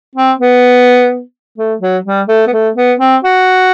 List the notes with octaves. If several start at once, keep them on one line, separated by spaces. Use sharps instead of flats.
C4
B3
A3
F#3
G3
A3
B3
A3
B3
C4
F#4